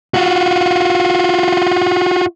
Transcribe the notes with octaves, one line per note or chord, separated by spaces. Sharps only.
F4 F#4